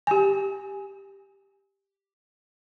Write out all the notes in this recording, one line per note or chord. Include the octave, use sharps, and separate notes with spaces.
G4 G#5